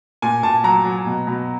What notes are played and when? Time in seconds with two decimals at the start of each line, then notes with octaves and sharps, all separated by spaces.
0.22 A#2 G#5
0.43 A#2 A5
0.64 F#3 A#5
0.85 F#3
1.06 B2
1.27 B2